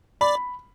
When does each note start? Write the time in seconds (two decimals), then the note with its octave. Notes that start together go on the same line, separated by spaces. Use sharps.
0.21 D5 B5